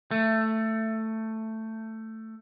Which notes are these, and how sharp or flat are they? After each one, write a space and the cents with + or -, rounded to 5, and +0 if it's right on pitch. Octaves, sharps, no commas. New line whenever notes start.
A3 +10